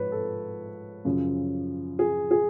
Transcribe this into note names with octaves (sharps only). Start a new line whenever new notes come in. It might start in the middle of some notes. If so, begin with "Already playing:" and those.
Already playing: G#2 F3 B4 C#5
A4
F#2 C#3 F3
G#4
G#4